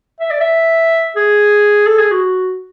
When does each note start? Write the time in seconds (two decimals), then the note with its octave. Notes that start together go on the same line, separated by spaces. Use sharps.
0.20 E5
0.31 D5
0.41 E5
1.16 G#4
1.86 A4
1.98 G#4
2.11 F#4